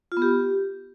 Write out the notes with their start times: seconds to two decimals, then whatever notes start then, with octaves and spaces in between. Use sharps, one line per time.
0.12 F4
0.17 B3
0.22 G4